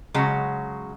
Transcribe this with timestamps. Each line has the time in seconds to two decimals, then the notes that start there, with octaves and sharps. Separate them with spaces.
0.14 C#3 F#3 G#3 F#4